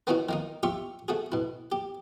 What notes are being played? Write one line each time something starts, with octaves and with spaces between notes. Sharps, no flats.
A#3 B3 C#4 D#4 E4 F#4
D#3 A#3 D#4
F4 G4 E5 C#6
A3 F#4 G#4
B2 E4
G4